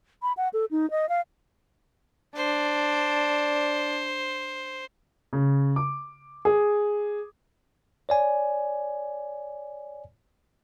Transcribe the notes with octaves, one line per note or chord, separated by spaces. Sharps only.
B5
F#5
A4
D#4
D#5
F5
D4 C5
C#3
D6
G#4
C#5 D5 G#5